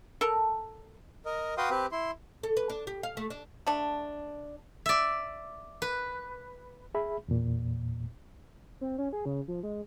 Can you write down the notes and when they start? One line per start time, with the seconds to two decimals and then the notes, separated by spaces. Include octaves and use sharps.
0.21 A4 A#4
1.25 A#4 D#5
1.58 F#4 B4 F5 G5 C6 D#6
1.70 C4 G4 B4
1.92 E4 C6
2.43 A4
2.57 B4
2.70 D4
2.87 G4
3.03 F5
3.17 A3
3.30 D4
3.67 A3 D4
4.86 D5 E5
5.82 B4
6.95 G#4 E5 B5
7.28 E2 A#2
8.81 C4
8.98 C#4
9.13 G#4
9.25 C#3
9.48 F3
9.63 G#3